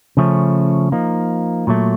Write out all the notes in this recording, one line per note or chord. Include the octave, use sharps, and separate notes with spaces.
C#3 F3 A3 C#4
F3 A#3 D#4
A#2 F#3 A3